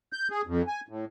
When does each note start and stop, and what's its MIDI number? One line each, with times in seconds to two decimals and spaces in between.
0.13 0.28 91
0.31 0.41 68
0.47 0.62 41
0.67 0.80 80
0.89 1.05 45